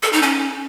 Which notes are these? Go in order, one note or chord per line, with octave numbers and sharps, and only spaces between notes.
A4
D#4
C#4